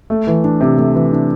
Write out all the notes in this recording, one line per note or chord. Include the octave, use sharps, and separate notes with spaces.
A3
E3
D4
C3
A3
E3
D4